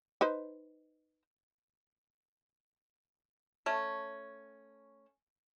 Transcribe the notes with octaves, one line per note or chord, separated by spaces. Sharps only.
D#4 B4 C5
A3 C#4